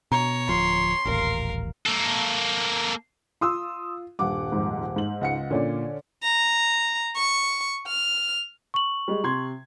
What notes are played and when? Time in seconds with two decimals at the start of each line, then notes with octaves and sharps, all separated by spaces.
0.12 B2 C#5 A#5
0.49 D1 F3 C6
1.05 D#1 A1 A#4 F5
1.86 A#3 A4
3.41 F4 C6 D#6 E6
4.19 D#1 G2 F#5 D6
4.52 F2 G#2
4.96 G#2 F#7
5.21 C#2 F#5 C#7
5.50 A#2 D3 C#4 D5
6.23 A#5
7.16 C#6
7.87 F6
8.74 C#6 F#7
9.08 G3 G#3
9.24 C3 C6 G#6